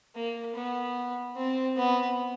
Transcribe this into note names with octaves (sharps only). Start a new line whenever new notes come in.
A#3
B3
C4
B3